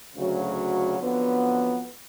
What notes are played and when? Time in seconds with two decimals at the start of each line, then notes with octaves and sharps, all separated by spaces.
0.16 D2 C#3 F#3
0.98 F2 D3 F#3 B3